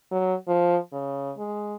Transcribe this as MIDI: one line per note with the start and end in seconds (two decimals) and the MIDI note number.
0.11 0.34 54
0.47 0.77 53
0.92 1.31 49
1.37 1.76 56